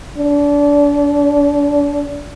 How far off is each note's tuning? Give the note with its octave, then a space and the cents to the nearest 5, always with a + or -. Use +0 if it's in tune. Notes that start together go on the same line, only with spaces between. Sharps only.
D4 -30